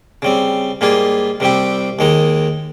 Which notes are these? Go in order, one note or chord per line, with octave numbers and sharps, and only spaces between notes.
C#3 G3 C4
G#2 G3 A#3 F4 G#4
C2 C3 G3 C4 G4
D#2 D#3 G#3 D#4